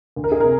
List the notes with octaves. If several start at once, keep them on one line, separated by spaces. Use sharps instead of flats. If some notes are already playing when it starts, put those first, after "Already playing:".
D2
A#4
G#4
C3 A#4